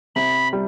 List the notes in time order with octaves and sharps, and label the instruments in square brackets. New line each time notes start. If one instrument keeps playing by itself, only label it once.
[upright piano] C3 [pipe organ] B5
[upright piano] G3